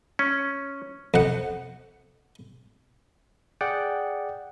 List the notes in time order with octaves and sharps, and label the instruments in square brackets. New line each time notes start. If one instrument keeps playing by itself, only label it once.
[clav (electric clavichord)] C#4
[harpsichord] F2 F#5
[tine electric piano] G#4 D5 F#5 G5